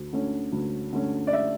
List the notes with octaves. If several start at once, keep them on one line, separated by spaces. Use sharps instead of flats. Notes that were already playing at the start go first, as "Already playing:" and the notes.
Already playing: D2
D3 A3 C#4
D2
D3 A3 C#4
D5
E5